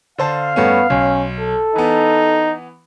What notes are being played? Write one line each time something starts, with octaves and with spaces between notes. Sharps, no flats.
D3 C5 F5 A5
G2 A3 B3 C#4
B1 C#4
A4
E3 B3 D#4